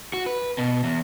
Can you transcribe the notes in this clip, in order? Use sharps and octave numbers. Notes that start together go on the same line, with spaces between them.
F#4
B4
B2
E2